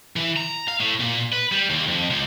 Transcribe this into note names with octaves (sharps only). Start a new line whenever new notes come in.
E3
A#5
F5
A2
A#2
B4
G3
D#2
F2
C#2